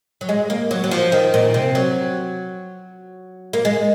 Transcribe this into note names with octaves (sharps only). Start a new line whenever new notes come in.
F#3
G#3
A#3
F#3
F#3
F3
D#3
A#2
C3
F#3
A#3
G#3